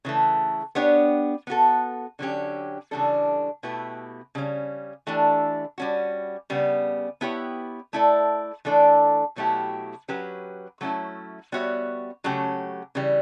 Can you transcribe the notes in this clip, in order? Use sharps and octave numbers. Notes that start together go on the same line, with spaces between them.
C#3 E3 A3
B3 D4 G4 C#5
B3 F#4 A4
D3 F#3 C#4 G4
C#3 E3 G3 D4 A4
B2 A3 E4 G4 B4
C#3 G3 C#4
E3 A3 D4 G4
G3 C#4 F#4
C#3 G3 B3
B3 E4 G4 C#5
A3 E4 A4 D5
E3 A3 D4 A4 D5
B2 F#3 A3 E4 G4
F#3 C#4 G4 B4
F#3 A3 C#4 E4
G3 B3 F#4 C#5 E5
C#3 F#3 A3 C#4 G4
C#3 E3 G3